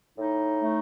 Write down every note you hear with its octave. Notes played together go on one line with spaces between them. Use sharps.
A2 D#4
A3